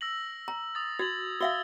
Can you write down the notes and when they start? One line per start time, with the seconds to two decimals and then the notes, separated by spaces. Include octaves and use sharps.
0.01 E6 A#6 F#7
0.48 A#5
0.75 D#6 A6
0.99 F#4 G#6 A6 F#7
1.41 F#4 E5 F5 E6 G7